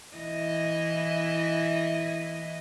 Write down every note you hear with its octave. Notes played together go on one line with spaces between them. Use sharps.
E3 E4 D#5